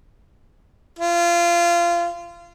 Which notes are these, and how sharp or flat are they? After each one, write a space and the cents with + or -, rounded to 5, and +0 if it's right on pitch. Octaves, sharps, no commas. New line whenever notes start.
F4 -25